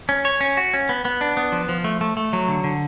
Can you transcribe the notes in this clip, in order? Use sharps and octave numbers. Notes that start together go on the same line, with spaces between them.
C#4
C#5
C#4
F#4
C#4
B3
B3
D4
B3
F3
F3
A3
A3
A3
F#3
D3
D3